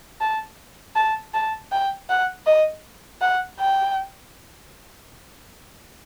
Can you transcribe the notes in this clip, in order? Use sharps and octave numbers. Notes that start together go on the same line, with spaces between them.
A5
A5
A5
G5
F#5
D#5
F#5
G5